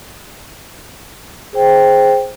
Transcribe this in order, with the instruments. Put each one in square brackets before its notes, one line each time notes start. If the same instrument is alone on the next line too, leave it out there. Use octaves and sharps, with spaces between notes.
[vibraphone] G#4 C5 G5